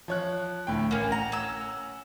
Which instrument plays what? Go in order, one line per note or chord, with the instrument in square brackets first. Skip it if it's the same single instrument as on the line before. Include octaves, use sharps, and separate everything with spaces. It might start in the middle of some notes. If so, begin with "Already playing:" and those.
[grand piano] F3 C#5 F#6
D2 A2 G5
[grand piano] A1 [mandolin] A#3 C#4
[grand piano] F#5 [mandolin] A#5
[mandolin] C#4 E6